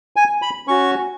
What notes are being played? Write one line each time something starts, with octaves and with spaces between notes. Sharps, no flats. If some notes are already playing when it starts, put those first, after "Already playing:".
G#5
B5
C#4 F#4 C#6